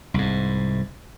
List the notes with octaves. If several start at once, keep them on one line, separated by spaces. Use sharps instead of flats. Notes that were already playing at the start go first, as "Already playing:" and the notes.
C2 G#2